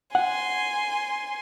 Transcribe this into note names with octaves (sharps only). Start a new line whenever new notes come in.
F#5 G#5 C6